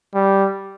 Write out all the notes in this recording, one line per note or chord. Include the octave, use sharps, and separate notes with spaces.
G3